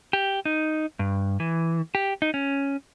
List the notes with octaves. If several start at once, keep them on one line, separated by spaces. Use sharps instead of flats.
G4
D#4
G2
E3
G4
D#4
C#4